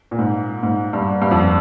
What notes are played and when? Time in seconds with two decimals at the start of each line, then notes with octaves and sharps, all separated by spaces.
0.11 A#2
0.19 G#2
0.63 G#2
0.93 G2
1.22 G2
1.31 F2